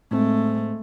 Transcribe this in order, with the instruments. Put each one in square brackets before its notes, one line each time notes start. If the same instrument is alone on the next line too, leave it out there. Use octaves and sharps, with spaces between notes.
[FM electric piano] A2 C4 [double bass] G#3 A3